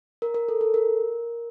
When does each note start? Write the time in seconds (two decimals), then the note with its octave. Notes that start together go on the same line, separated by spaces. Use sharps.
0.22 A#4
0.35 A#4
0.49 A4
0.61 A4
0.74 A#4